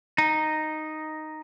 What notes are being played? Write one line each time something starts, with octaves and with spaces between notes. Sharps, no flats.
D#4